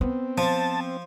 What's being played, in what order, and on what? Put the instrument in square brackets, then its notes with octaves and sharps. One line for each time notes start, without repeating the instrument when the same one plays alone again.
[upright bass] B3 [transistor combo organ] C4
[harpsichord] F3 [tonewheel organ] A5